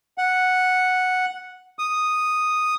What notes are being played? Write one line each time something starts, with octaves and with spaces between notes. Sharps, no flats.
F#5
D#6